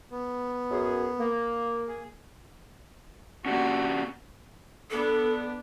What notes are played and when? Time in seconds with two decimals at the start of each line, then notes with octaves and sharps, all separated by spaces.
0.11 B3
0.71 F#2 G#4
1.19 A#3
1.88 G#4
3.46 A#3 C#4 D4 F#4 G4
4.90 B3 D4 A4